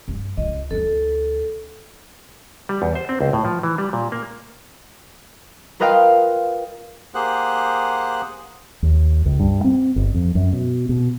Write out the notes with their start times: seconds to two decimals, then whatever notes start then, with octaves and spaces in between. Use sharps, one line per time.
0.08 G2
0.37 C#2 D#5
0.71 D2 D4 A4
2.69 G3
2.82 E2
2.95 C5
3.09 C4
3.21 C#2
3.33 A2
3.45 F3
3.63 E3
3.78 G3
3.93 A#2
4.12 A#3
5.80 F4 A#4 B4 D#5 F5 G5
7.14 A#3 G4 G#4 C5 F#5
8.83 D#2
9.25 C#2
9.40 G2
9.64 C4
9.96 G1
10.14 F2
10.35 F#2
10.53 B2
10.89 B2